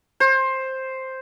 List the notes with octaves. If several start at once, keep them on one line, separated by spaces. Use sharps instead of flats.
C5